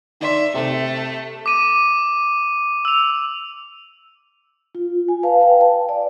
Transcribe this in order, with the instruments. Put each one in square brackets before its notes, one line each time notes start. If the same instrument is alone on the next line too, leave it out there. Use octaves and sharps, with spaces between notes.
[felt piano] D#3 D5 C6 [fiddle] E5
[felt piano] C3 [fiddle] A3 A4
[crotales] D6 D#7
E6 F7
[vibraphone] F4
G#5
B4 F5 A5
B4 F5 G5
A5
D5